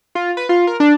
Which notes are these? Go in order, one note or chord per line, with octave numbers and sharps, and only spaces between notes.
F4
B4
F4
A#4
D4